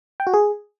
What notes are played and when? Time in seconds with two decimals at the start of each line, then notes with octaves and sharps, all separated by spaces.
0.20 G5
0.27 F#4
0.34 G#4